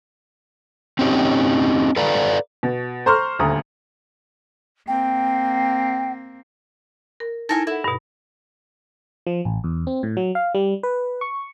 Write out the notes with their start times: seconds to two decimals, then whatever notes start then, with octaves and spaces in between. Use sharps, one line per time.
0.99 C4 C#4 D#4 G4
1.96 A4 B4 D5 F5 A#5
2.63 B2
3.06 C5 A#5 C6 C#6 F6
3.39 D#1 D2 A#5 D#6
4.88 A#3 C4 G5
7.20 A#4
7.49 D#4 E4 A4 A#4 G#5 A5 A#6
7.67 E4 A4 F#5
7.84 G2 B2
9.27 F3
9.45 A1
9.64 E2
9.87 C4
10.03 A2
10.17 F#3
10.35 F5
10.55 G3
10.83 B4
11.21 C#6